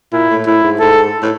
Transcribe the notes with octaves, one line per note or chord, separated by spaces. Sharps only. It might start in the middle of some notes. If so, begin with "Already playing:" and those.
A#2 E4
A2
A2 E4
G#2
G#2 A4
A2